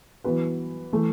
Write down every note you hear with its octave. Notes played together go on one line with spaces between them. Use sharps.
E3 B3 F#4 B4
E3 A3